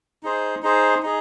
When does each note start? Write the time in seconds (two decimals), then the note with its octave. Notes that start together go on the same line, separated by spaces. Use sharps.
0.23 D#4 G#4 C5
0.63 D#4 G#4 C5
1.03 D#4 G#4